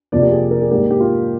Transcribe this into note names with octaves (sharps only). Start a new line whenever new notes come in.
F2 C3 F3 A#3 D5
G4
G#4
A#4
G#4
G#2 G3 A#3 G4
G4
F4